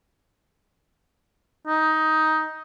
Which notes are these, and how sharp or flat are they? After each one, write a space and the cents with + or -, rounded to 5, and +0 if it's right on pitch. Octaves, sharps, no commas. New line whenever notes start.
D#4 +10